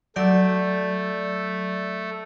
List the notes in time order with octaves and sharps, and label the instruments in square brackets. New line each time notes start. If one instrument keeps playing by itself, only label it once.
[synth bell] F#3 D5 G6 [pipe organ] A3